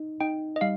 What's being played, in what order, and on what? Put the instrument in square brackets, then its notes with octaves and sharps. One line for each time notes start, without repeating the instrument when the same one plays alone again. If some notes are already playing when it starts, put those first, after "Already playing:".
Already playing: [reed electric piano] D#4
[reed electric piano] D#4 [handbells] G5
[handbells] D#5
[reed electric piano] G3 [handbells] F5